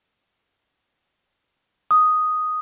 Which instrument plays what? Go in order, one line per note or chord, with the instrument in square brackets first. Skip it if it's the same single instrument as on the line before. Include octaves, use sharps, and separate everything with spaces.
[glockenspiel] D#6